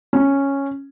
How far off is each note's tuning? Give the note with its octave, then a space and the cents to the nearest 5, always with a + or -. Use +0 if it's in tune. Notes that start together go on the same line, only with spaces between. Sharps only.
C#4 -5